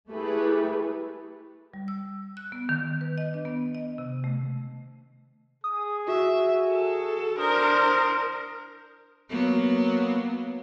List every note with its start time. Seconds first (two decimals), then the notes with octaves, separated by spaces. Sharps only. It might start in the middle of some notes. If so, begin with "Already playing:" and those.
0.11 A3 E4 G4 G#4 B4
1.74 G3
1.88 E6
2.37 F#6
2.52 B3
2.69 D#3
3.01 B4
3.18 D#5
3.34 D4
3.45 B3
3.75 D#5
3.98 C3
4.24 A3
5.64 G#4 D#6
6.08 F#4 E5
6.68 A4
7.39 D4 A#4 C5 D#6
9.30 F#3 A#3 B3